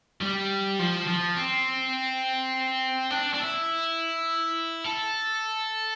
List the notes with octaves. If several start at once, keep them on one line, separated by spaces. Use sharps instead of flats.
G3
F3
F3
C4
D4
D4
E4
A4